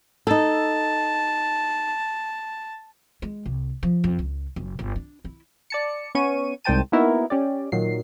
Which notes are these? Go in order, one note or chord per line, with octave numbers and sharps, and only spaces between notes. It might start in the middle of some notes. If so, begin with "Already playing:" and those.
D#4 A4 A5
G#3
C2
F3
F2
C#2
F#1
G1
D4
E4
D5 A5 C#7
B3 C#4 C#6 D#7
C2 G#2 C5 G5 A5 D#7
A#3 B3 D#4 E4 F#4 A#4
C#4 G4 D5
A#2 D#3 F#3 C7